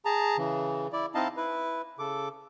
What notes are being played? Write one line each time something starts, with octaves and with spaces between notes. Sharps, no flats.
G#4 A5 A#5
C#3 E3
E4 D5
C4 D#4 E4 D#5 F5 A5
E4 B4
C#3 A4 D6